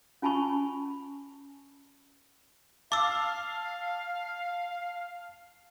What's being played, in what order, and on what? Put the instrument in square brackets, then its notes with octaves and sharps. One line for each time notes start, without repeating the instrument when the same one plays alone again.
[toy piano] C#4 F4 G#5 A5 B5 C#6
[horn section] F5 [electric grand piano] A5 A6 [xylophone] D6 E6